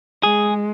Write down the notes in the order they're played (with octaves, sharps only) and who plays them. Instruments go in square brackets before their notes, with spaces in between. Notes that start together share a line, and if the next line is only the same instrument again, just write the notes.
[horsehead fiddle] G#3 [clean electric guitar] G#4